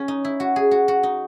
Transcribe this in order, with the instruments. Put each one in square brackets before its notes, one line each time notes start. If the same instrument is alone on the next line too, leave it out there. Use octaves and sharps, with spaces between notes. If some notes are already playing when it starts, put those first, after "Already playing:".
Already playing: [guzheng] C#4
D#4
E4
F#4
G#4
F#4
F#4
D#4